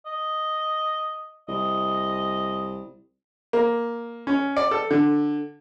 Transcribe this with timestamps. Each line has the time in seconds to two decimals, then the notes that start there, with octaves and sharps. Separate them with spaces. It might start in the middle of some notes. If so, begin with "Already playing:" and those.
0.06 D#5
1.48 C2 D#5
3.53 A#3
4.27 C#4
4.56 D5
4.71 A4
4.91 D3